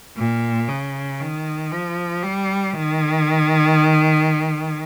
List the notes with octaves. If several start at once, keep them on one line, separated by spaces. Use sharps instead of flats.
A#2
C#3
D#3
F3
G3
D#3